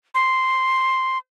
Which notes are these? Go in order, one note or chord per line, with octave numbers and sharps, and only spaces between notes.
C6